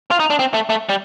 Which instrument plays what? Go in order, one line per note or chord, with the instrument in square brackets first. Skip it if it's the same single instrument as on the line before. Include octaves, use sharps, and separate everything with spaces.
[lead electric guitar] F4
D#4
D4
C4
A3
A3
G3